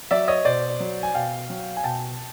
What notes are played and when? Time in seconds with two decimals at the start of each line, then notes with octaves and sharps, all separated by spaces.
0.11 F#3 D5 E5
0.28 C#5 D#5
0.45 B2 C5 D5
0.80 F#3
1.03 G#5
1.15 B2 F5 G5
1.50 F#3
1.77 G#5
1.84 B2 G5 A5